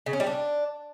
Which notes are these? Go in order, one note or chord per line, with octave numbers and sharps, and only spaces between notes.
C#3
C#4
G3
D4